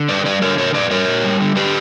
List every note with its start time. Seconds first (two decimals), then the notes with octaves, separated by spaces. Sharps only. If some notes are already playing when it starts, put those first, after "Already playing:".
Already playing: D3
0.09 G3 B4 D5
0.25 G3 B4 D5
0.42 D3 A#4 C#5
0.58 A#2 A#4 C#5
0.74 A#2 B4 D5
0.91 G3 A#4 C#5
1.08 A#2
1.24 G3
1.41 D3
1.56 D3 G4 B4